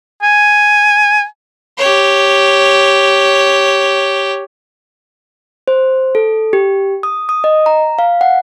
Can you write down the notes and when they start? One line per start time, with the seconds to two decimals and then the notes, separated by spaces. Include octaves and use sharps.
0.23 G#5
1.78 G4 C#5
5.68 C5
6.15 A4
6.53 G4
7.03 D#6
7.29 D#6
7.44 D#5
7.66 A#5
7.99 F5
8.21 F#5